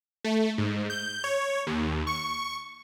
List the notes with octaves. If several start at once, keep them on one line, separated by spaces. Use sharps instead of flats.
A3
G#2
G6
C#5
D#2
C#6